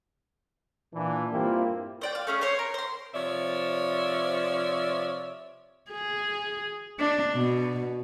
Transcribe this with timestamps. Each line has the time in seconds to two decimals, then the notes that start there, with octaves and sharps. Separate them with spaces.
0.95 A#2 E3 D4
1.33 G2 A#3 C4 E4 F4 G4
2.01 C5 D5 G5
2.15 F5
2.27 A3 C#4 G#4
2.41 C5 C#5 C#6
2.59 A#4
2.74 C5 C6
3.14 C3 F3 C#5 D5 E5
5.91 G#4
6.99 D4
7.34 B2